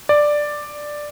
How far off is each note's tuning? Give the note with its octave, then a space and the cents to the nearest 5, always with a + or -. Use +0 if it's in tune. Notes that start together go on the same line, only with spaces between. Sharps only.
D5 +5